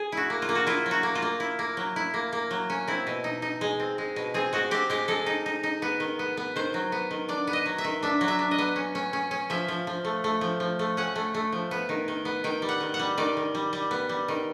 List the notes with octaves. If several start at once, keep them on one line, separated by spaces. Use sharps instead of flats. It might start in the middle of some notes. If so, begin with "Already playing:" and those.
Already playing: G#4
E4 F#4
A#3
F4
A#3
F#4
E4 F4
F#3
F#4
A#3
F4
A#3
E4
A#3
F#3
E4
A#3
A#3
F#3
C#4
C4 E4
B2
D#4
D#4
G#3
C4
G#3
B2
C4 G#4
G#3 F#4
C4 G4
G#3 G4
G#3 A4
D#4
D#4
D#4
B3
D#3
B3
B3
D#3 C5
F#3
B3
D#3
D4 D5
B3
D#5
F#3
E5
D#3
D4 E5
F#3
E5
D4
D#5
B3
C#4
C#4
C#4
C#4
F3 E5
F3
F3
A3
A3
F3
F3
A3
C#4 F#5
A3
A3
F3
B3
D#3
D#3
B3
D#3 G5
G3
F#5
D#3
F#5
G3
D#3 D5
D#3
G3
G3
B3
G3
D#3